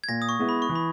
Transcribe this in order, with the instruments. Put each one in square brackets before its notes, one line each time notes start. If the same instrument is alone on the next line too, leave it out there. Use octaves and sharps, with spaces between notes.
[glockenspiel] G#6
[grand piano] A#2 [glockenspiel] A#6
[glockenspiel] D#6
C#6
[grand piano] G#3 B3 E4
[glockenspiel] B5
C#6
[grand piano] E3
[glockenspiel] B5